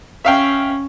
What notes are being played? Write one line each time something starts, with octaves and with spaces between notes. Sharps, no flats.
C#4 E5 F5 G5